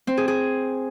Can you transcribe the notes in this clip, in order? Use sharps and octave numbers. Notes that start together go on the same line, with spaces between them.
C4
G#4
G#4